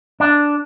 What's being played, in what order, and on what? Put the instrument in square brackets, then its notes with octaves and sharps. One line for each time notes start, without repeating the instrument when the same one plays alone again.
[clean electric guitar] D4